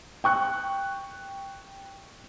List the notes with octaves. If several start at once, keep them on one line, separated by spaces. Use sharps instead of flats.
G5 C#6 F#6